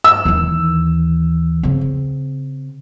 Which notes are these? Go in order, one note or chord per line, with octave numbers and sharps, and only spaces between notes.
E6
D#2 E3
C#3 C4